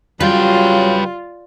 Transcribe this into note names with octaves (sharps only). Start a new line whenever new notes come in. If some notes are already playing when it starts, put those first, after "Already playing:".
C#3 F#3 G3 F4 B4 G5